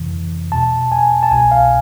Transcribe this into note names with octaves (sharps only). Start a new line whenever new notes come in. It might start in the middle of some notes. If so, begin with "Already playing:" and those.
Already playing: F2 C3 E3
E2 B2 A5
G#5
A5
C2 B2 G#5
F5